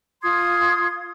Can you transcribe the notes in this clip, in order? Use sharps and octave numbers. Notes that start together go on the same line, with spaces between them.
F4 C6 D#6 G#6